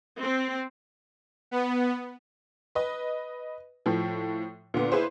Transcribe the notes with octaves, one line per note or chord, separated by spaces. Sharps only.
C4
B3
B4 D#5
A2 F3
A#2 D3 B3
E4 G#4 B4 C5